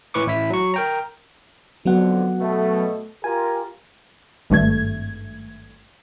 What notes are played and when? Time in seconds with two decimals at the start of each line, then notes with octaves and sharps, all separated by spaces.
0.14 A2 E3 B4 C#6 D6
0.26 A1 E4 B6
0.50 F#3 C#6
0.74 A#4 G5 A#5
1.85 F2 D3 F#3 B3 F#5
2.39 B2 A3
3.24 F4 G4 A#4 G#5
4.50 G#1 G2 A3 G#6